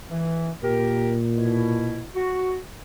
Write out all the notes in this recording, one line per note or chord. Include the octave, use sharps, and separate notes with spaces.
E3
A#2 G4 A#4
B2 E4
F#4